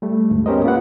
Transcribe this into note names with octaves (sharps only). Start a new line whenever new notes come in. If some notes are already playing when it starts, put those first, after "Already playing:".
G3 A3
D2 G#2
B3 C#4 G4 A#4 C5 D#5
A#3 F4 B4 F#5